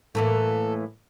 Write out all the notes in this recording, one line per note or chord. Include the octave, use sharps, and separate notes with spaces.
A2 E3 A#3 A4